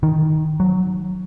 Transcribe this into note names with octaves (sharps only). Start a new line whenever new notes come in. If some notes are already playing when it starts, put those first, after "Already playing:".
D#3
F#3